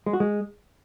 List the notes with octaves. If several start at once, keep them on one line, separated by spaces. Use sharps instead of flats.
G#3
F#4
G#3